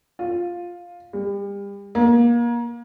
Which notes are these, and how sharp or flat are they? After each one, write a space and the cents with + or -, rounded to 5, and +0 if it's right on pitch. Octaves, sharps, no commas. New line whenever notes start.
F4 +5
G3 +35
A#3 +30